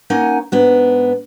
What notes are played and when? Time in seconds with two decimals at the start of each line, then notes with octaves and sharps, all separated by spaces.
0.10 A#3 C#4 D#4 F#5 G#5
0.52 G#2 B3 D4